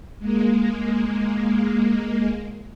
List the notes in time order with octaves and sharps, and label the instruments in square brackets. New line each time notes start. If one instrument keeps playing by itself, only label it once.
[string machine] G#3 A#3